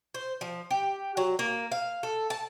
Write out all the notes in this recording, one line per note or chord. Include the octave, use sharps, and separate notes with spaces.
C5
F3
G4
F#3
A#3
F5
A4
A5